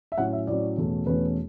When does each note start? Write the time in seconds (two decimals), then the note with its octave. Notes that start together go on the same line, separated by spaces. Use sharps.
0.12 E5
0.18 A2 F#3 C#4 F#5
0.33 E5
0.47 A2 F#3 C#4 D5
0.78 E2 B2 A3 C#4
1.07 E2 B2 A3 C#4 B4